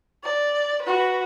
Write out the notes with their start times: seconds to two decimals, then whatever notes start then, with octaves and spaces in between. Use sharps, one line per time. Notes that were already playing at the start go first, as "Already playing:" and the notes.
0.24 D5
0.82 F#4 B4